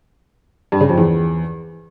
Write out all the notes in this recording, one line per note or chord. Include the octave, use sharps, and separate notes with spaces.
G2
C#3
F2
E2